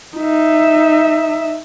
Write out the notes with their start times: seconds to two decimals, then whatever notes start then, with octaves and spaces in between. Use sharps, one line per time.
0.17 D#4 E5